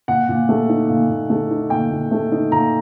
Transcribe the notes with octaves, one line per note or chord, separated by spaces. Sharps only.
A#2 F#5
A#2
A3
D#4
A#2
A#2
A3
D#4
A#2 G5
A#2
A3
D#4
A#2 A#5